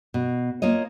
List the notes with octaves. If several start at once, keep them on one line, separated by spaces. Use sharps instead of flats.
B2
A#3 F4 C#5 D#5